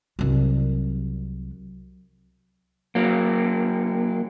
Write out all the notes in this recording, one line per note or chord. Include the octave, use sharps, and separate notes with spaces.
C2 F#3
F#3 A#3